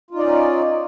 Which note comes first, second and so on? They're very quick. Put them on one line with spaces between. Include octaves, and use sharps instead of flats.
F4 D#4 D5 C#4